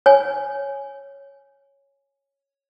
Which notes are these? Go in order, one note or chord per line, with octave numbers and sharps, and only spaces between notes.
C#5 G#5